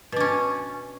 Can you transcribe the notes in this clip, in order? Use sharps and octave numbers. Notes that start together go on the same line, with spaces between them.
B2 C#4 D4